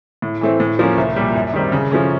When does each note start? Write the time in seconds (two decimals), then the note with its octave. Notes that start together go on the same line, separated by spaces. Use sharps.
0.22 A2
0.41 E3 A3 C4
0.60 A2
0.79 F3 A#3 C#4
0.97 C2
1.16 A#2 G3
1.35 F#2
1.54 D#3 G3 C4
1.72 C#3
1.92 F3 A3 C#4